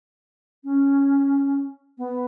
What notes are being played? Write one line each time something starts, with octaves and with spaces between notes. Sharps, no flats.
C#4
B3